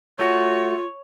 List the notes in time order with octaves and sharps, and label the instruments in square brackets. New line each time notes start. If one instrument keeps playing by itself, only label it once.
[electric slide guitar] A3 F#4 [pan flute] F4 [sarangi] C#5